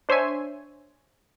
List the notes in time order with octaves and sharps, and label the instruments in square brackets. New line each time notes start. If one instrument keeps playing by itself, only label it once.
[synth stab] D4 C5 C#5 E5 G#5